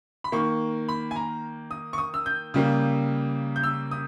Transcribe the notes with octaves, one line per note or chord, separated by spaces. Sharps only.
B5
D#3 A#3 C#6
B5
G#5
A#5
D#6
C#6
D#6
E6
G6
C#3 G3 A#3
G6
E6
D#6